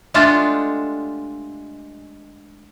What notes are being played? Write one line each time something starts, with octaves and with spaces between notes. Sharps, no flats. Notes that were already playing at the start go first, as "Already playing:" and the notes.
G#3 A3 D4 F4 G4 F#5